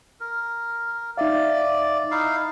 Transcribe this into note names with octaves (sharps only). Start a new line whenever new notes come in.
A#4
D#4 D5 E5 F5
D#4 E4 F5